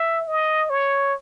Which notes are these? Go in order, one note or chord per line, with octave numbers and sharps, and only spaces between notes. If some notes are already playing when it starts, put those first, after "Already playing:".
Already playing: E5
D#5
C#5